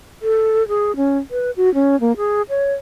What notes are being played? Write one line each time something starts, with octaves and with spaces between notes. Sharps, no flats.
A4
G#4
C#4
B4
F#4
C#4
A#3
G#4
C#5